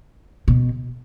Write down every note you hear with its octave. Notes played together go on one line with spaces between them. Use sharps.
B2